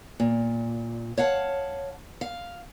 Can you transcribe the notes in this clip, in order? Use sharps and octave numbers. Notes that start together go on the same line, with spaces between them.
A#2
C#5 F5 F#5 A5
F5